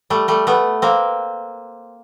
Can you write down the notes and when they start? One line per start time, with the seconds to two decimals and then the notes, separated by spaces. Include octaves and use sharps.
0.10 G3 A3
0.28 G3 A3
0.47 A3 B3
0.82 A#3 C4